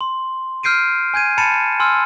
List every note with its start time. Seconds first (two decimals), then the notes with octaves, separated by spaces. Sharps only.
0.01 C6
0.63 F6 G6 C7 D7 D#7
1.14 G#5 G6 G#6 D#7
1.38 A5 B5 A6 C#7 D#7 E7
1.80 G#5 C6 E6 F6